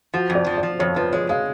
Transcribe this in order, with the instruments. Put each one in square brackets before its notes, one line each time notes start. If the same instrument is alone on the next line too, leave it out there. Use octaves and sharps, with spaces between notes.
[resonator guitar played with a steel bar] F3 [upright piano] F#4
[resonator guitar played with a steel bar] F2
[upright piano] D5
[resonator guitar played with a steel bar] F3
[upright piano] D5
[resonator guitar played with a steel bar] F3
[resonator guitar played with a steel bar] F2 [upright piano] C#5
[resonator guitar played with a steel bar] F3 [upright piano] B4
[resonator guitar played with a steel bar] G#3 [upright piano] C#5
[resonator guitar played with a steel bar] G#3 [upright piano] F5